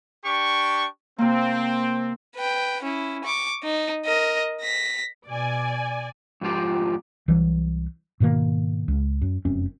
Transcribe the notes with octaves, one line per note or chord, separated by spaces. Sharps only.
D4 G4 C#6
C3 A#3 C4
B4 G5
C#4 E4
C#6 D6
D#4
A#4 D#5
A#6 B6
B2 D5 G#5
F2 G#2 F3 F4 G4
C2 E3 F#3 G3
G#2 B2 D#3 A#3
C#2
F#2
F1 F#2 C4 C#4